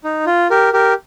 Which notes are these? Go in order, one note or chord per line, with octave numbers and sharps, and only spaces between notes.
D#4
F4
G4 A#4
G4 A#4